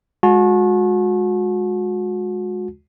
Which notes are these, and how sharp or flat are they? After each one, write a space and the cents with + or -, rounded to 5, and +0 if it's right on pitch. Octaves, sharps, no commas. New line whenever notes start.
G#3 +0 F#4 -35 A5 -35